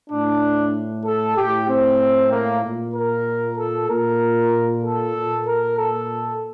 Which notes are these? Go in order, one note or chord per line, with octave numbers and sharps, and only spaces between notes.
A2 D4
A4
A2 G4
C4
A#3
A#2
A#4
A4
A#2 A#4
A4
A#2
A#4
A4